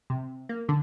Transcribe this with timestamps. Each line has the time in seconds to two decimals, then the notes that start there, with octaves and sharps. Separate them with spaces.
0.10 C3
0.49 A#3
0.69 D3